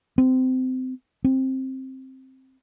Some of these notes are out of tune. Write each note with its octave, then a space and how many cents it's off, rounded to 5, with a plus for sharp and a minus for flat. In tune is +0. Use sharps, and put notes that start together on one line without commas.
C4 -25
C4 +10